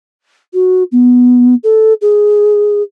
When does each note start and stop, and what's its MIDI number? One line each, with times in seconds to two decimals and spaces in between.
0.54 0.83 66
0.92 1.55 59
1.64 1.93 69
2.02 2.83 68